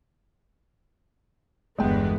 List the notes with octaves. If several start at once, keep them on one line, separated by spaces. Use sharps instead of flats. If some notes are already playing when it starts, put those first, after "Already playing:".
G1 E2 G#3 B3 G5